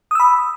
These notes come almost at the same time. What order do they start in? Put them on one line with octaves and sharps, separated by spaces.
D#6 E6 B5